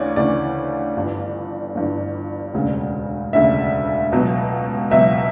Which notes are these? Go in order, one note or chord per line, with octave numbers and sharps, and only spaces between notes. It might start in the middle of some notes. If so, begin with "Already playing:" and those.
Already playing: D2 C#3 E3 C#5 D5
D2 C#3 E3 D5
G1 G2 E3
G1 G2 E3
E1 D2 C#3
E1 D2 C#3 E5
C#2 B2 F#3
C#2 B2 F#3 E5